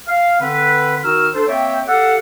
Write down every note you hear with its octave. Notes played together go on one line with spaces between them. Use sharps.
F5
D3 C4 B4
D#3 D#4 F#4 E6 F6
D4 A4 C5
A#3 C4 C#5 E5 G5
G4 A4 F5 F#5